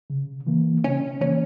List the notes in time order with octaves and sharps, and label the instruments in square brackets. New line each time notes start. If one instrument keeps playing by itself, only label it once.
[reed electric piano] C#3
E3 A#3
[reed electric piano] C#3 [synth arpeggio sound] C#4
[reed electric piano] E3 A#3 [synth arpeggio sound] C#4